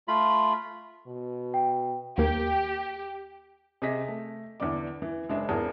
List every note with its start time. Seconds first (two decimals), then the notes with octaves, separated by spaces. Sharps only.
0.08 A3 F4 B5
1.07 B2
1.54 G5
2.18 D#2 A#3 G4
3.82 C3 G#4 D#5 A#6 B6
4.08 A3
4.60 E2 D3 E3 D5 D6
5.02 E3
5.29 F#1 G#3 D4 E5
5.49 G#1 E2 G#4 A#4 A5